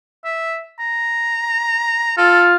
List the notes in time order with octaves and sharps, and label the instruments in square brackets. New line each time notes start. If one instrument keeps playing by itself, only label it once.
[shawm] E5
A#5
[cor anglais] F4 [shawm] A4